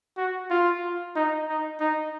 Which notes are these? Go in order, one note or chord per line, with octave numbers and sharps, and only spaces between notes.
F#4
F4
D#4
D#4
D#4